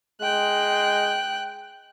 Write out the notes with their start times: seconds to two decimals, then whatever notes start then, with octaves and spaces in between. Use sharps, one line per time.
0.22 G#3 G5 F#6